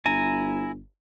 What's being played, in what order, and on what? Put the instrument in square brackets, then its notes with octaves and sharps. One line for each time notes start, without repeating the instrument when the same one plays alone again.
[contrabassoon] G1 [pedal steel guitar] E4 G#5 A#5